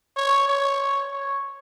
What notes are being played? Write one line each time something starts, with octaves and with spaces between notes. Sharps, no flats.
C#5
C#5
C#5